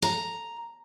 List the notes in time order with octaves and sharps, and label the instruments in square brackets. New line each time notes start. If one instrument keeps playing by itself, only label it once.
[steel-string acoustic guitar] A#5